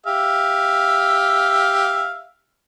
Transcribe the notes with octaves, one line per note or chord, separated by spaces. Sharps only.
G4 E5 F5